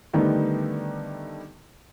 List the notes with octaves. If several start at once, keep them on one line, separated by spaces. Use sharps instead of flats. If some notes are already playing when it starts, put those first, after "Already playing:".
D3 D#3 G3 A3 B3 D#4